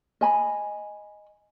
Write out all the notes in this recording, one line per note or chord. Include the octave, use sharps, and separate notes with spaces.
D#5 G#5 B5